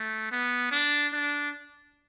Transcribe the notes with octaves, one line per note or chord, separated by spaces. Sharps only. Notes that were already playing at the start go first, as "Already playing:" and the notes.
Already playing: A3
B3
D4
D4